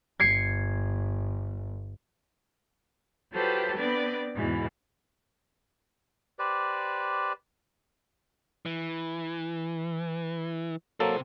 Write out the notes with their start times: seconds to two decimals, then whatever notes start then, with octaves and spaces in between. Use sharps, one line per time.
0.20 G1 G#6 C7 C#7
3.32 F#3 F4 G4 A4 B4 C5
3.76 B3 C4 D4 B4 D5
4.35 E2 G#2 B2 E3
6.39 G4 B4 C5 D5
8.66 E3
11.00 C3 F#3 A#3 A4 C5